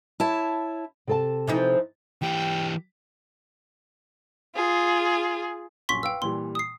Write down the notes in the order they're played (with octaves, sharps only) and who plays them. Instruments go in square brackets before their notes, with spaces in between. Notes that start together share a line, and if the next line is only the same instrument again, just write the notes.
[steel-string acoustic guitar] E4 C#5 A5
[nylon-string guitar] C3 A4 A5
[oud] E3 F3 D#4
[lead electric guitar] E3 G4 [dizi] G5
[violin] F4 G#4
[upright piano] A#1 F#2 [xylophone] C6 C#6 B6
[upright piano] B4 F5 [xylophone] G5 E6
[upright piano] A#2 E3 G3 [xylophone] C6
[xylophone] D#6 C7